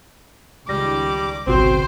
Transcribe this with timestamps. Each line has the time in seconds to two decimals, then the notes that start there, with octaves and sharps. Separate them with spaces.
0.69 C#2 D#3 G3 D6 A#6
1.47 G#1 C#2 F#2 B2 D3 C4 F#4 C5